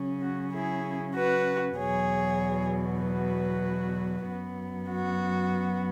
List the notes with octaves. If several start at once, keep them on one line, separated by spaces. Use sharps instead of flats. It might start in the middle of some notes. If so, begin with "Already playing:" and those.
Already playing: C#3 F#3 C#4
F#4
E4 G#4
F#4 B4
E2 B2 F#3 G#4 C#5
F#4 B4
F#2 F#3 B3
F#4